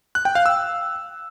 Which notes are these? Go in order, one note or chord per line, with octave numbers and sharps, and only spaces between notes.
F#6
G5
F5
E6